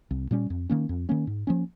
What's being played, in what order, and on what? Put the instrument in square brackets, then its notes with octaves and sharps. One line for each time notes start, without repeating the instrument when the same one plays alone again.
[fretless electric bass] C2
A#2 G3 C#4
F2
D#3 A#3 C#4
F2
D#3 A#3 C#4
G#2
F3 A#3 C#4